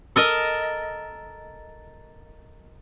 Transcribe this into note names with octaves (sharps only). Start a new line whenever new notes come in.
A4 A#4 D#5